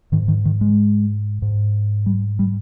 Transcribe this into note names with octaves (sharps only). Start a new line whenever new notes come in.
G#2 D#3
D#3
D#3
G#3
G#2
G3
G3